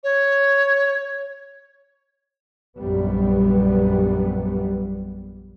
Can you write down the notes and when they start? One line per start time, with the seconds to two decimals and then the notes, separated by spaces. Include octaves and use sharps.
0.04 C#5
2.77 A#1 F#2 G3 B3